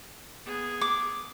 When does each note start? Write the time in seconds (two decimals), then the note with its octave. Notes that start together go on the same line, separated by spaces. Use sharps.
0.46 B3 G#4
0.81 D6